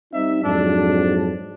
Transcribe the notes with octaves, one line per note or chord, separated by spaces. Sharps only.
G3 C4 D#4 E5
F2 G#2 F#3 D4